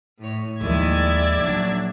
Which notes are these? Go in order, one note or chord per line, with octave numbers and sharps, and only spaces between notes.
A2 C#5
D#2 D#3 F3 G#3 E4 D5 E5 G#6
A#1 F#3 D4